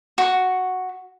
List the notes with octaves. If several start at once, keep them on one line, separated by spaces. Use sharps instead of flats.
F#4 C#6